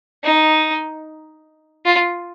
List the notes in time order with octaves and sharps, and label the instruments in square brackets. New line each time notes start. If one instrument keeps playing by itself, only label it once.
[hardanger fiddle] D#4
F4